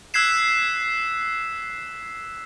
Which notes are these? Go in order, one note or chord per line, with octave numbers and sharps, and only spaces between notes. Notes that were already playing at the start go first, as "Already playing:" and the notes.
E6 F#6 G#6 B6 C7 E7